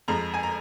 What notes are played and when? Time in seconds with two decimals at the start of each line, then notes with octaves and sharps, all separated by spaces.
0.08 F2 F3 G#3 A#5
0.34 G#5
0.43 A#5